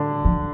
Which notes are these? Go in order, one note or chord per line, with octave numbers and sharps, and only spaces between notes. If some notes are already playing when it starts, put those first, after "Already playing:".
Already playing: D3 D4
F3